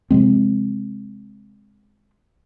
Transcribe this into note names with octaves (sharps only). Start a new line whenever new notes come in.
C3 F3 G#3 C4